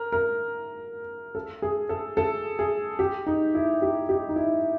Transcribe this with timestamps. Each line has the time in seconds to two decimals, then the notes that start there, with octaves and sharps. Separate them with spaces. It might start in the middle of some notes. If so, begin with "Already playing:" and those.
Already playing: A#4
0.12 A#4
1.35 A4
1.62 G#4
1.89 A4
2.17 A4
2.59 G#4
2.99 G4
3.26 D#4
3.55 E4
3.82 G4
4.09 G4
4.29 D#4
4.36 E4